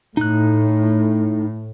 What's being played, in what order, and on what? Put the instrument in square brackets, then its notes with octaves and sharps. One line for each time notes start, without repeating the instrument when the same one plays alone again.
[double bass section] A2 [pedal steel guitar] D#4 F#6